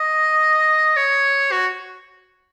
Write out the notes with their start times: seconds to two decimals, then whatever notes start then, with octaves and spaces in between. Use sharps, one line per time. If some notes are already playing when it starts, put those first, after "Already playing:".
Already playing: D#5
0.96 C#5
1.52 F#4